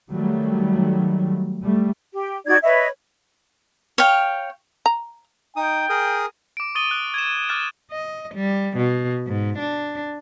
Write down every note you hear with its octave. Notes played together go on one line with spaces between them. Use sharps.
D#3 F#3 G3 A3
G3 A3
G4
D#4 F#4 D5 G#6
B4 C#5 D#5 E5
C#5 F5 G5
A#5
D#4 G5 D#6
G#4 A#4 D#6
D6 D7
C#6 D#6 A6 D#7 G7
F#6
G#6 E7
D6 F6 F#6 A6 D#7 E7
D#5
G3
B2
G#2
D4